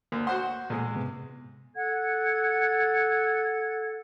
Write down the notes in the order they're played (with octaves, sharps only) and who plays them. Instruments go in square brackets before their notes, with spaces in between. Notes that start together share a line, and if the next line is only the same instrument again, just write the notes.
[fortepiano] D2 [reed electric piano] A#3
[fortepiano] F#4 C5 C6 [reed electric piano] F#5
[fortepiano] E2 G#3 [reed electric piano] A#2
[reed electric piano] G#2 C3 B3
[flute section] A4 F#5 G#6